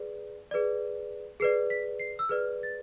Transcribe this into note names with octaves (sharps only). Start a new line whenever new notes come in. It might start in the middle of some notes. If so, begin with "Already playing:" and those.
Already playing: G#4 B4 D5
G#4 B4 D5
G#4 B4 D5 C7
B6
C7
E6
G#4 B4 D5 F6
A6